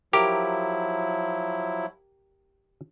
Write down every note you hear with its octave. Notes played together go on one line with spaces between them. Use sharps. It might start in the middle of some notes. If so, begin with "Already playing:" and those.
F3 F#3 E4 G4 A#4